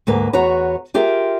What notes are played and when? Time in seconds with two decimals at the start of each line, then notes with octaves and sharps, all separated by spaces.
0.07 D2 G#2 A#3 B4
0.33 E2 F#4 B4 C#5 A#5
0.94 F4 G4 G#4 A#4 E5 G5